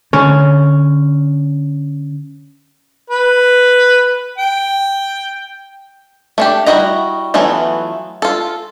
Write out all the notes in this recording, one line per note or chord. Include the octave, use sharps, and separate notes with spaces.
D3 C#4
B4
G5
A3 D4 G4
G3 E4 F#4 D#5 A#5
E3 F#3 A3 B3 F4
F4 A4